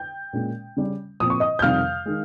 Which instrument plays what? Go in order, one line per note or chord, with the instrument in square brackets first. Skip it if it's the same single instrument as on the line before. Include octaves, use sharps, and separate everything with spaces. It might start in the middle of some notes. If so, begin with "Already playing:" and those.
Already playing: [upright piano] G5 G6
A#2 G#3 C#4
C#3 G3 C#4
A#2 F3 C4 D#6
C#6
D#5 D#6
G6
F2 C3 D#3 G3 F5 F6
D#3 G#3